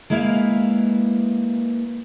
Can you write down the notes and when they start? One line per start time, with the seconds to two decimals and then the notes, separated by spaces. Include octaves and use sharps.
0.10 G#3 A#3 E4 B4 F5